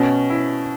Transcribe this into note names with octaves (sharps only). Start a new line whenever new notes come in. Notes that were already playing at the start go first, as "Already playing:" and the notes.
Already playing: B2 C#4
E4